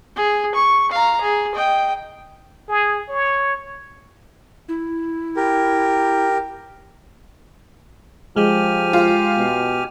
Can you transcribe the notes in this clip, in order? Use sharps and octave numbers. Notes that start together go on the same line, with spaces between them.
G#4
C#6
F5 A#5
G#4
D#5 G5
G#4
C#5
E4
G4 A#4
F3 G#3 G4 G#5 F6
F4
B2